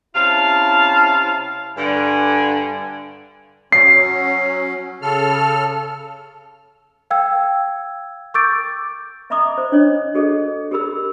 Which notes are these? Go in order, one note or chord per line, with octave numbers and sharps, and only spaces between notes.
C3 C#4 E4 F5 A5
G2 D3 G#5
F#3 C#4 C7
C#3 A4 F6
F5 G5 E6 G#6
C#6 D6 E6 G6 A6 D7
D#5 E5 A#5 B5 D6 D#6
C5
D4 C#5 D#5
F#4 G#4 A4 D#5
G4 G#4 A#4 B5 E6